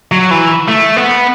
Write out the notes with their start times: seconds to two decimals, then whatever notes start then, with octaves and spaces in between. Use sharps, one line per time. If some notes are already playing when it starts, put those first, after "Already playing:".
0.12 F#3
0.31 E3
0.68 A3
0.97 B3